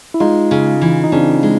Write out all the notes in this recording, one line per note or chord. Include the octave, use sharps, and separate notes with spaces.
E4
G#3 D#4 F4
C#3
E3
D#4
C#3 C4 D4
G#3